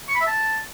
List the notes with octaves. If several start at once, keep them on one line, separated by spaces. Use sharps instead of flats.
C#6
B5
E5
A5